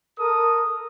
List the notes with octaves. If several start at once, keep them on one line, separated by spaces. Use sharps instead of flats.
A4 A#4 D#6